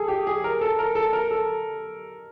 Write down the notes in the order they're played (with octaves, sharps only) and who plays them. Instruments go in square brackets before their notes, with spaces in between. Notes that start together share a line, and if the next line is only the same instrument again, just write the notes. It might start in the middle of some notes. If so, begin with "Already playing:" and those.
Already playing: [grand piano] G#4 A4
G4
G#4
A#4
A4
A#4
A4
A#4
A4